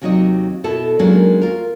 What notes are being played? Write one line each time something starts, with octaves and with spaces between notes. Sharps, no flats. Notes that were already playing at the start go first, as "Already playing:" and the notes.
D#2 C3 F#3 D#4 C#5 D#5
B2 E4 A4
D#3 F#3 G#3 A#3 C#4 D4
F4 A#4